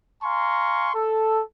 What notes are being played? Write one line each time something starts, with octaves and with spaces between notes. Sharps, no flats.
F5 G#5 A#5 C6 C#6
A4